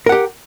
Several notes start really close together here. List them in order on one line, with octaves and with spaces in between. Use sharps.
A#4 F#5 G4